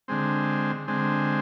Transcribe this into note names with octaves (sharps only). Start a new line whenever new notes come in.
D3 G#3 C4
D3 G#3 C4